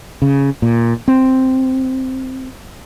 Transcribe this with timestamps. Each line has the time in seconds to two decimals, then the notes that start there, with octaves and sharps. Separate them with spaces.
0.22 C#3
0.62 A#2
1.08 C4